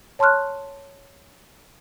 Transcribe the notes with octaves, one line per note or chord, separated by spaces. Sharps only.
C#5 A5 C6 C#6 F6 F#6